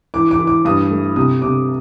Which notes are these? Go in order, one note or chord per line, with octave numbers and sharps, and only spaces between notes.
E3 D6
D6
E3
D6
G2 D#6
A3
C3 D#6
C3 D6